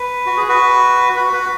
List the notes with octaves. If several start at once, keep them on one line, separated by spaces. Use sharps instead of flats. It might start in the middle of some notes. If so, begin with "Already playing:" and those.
Already playing: B4
F#4
G#4
F#4 B4
F#4 B4
F#4 B4